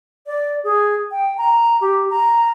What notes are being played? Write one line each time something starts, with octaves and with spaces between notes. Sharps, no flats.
D5
G#4
G5
A#5
G4
A#5